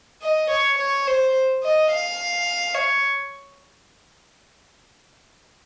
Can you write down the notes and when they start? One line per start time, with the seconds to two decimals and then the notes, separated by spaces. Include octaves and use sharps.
0.22 D#5
0.50 C#5
0.78 C#5
1.07 C5
1.63 D#5
1.91 F5
2.75 C#5